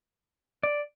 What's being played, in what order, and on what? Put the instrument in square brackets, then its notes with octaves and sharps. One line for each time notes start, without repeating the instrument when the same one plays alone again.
[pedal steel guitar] D5